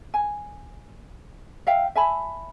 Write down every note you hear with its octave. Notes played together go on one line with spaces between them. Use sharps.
G#5
E5 F5 G5
E5 G#5 A5 B5